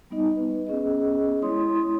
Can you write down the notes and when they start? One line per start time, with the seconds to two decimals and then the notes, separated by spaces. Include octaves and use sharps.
0.10 G3 B3 D#4 D#5
0.36 B4
0.67 B3 C#4 G#4 D#5
1.42 G#3 E4 C#5 C6 D#6